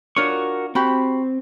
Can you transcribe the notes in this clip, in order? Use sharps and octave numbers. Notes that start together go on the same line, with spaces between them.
D4 F4 F#4 A#4 C#5 C#6
C4 F#4 G4 B5